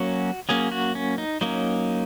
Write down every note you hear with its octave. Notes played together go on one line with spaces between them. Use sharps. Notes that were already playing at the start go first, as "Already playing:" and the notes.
Already playing: F#3 A#3 C#4 F#4
F#3 A#3 C#4 G#4
F#4
C#4
D#4
F#3 A#3 C#4 D#4